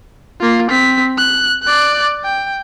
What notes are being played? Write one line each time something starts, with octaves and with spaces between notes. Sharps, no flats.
A#3 F4
C4 B6
F#6
D5 F#6
G5